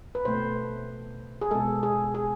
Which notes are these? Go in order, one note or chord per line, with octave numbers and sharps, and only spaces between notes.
B4
B2 A3 C5
G#4
B2 G#3 A4
G#4
G#4